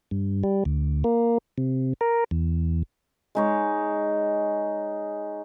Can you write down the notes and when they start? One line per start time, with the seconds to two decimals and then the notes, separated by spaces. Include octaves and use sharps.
0.11 G2
0.43 G3
0.65 D2
1.04 A#3
1.58 C3
2.01 A#4
2.31 E2
3.35 G#3 D#4 C#5